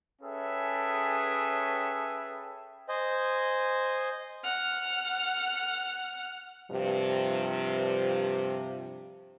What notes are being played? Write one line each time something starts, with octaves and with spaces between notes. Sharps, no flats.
C#4 G#4 A4 B4 E5 G5
C5 D#5 G#5
F#5 F6
G2 C3 F3